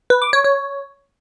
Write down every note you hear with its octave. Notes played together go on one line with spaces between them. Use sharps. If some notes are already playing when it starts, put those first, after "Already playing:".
B4
D6
C#5
C#5